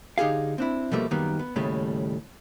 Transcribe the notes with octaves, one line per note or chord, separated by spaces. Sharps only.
D3 D#4 G4 G#4 F5
C4 D4 E4
B2 F3 G3 A3 A#3
F#2 D#3 G3 A#3 B3 D#4
B3
D#2 A2 C#3 G3 A3